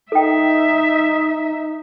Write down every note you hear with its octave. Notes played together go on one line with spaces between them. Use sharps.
D#4 A4 E5 G5